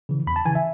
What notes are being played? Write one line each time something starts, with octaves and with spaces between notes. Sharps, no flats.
C#3 E3
E2 B5
A5
C#3 E3 G#5
E5